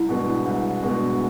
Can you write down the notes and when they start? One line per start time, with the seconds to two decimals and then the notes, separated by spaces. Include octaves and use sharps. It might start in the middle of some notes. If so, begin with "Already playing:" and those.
Already playing: C2 E4
0.09 B2 G#3 B3 D4
0.46 C2
0.82 B2 G#3 B3 D4